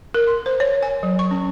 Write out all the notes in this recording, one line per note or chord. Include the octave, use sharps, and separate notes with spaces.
A#4
C6
C5
C#5
G#5
F#3
C#6
C#4